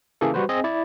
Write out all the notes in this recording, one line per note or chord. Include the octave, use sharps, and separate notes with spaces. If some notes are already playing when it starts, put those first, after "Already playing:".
C#3 E3 A#3 G#4 A4
G3 F#4 B4 C5
C4 G#4 D#5 G#5
E4 D5